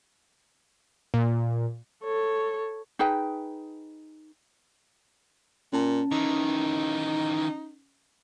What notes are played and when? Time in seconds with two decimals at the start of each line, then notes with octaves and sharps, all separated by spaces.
1.14 A#2
2.04 A4 C#5
2.99 D#4 G#4 B4 G5
5.73 A#2 C#4 A5
6.12 D#3 E3 D#4